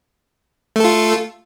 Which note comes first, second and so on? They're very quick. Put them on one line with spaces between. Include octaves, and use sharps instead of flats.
A3 A4 F4